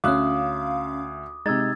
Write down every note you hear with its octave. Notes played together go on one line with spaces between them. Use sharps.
D2 C#4 E5 F5 D6 D#6 F#6
C3 G#3 D#4 E6 G#6 A6